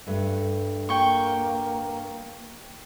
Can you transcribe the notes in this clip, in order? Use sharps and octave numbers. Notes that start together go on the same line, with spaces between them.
G2 A3
A#3 G5 C#6